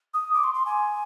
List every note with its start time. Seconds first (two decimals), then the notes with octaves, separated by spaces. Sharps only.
0.14 D#6
0.33 D6
0.44 C6
0.54 C6
0.66 G#5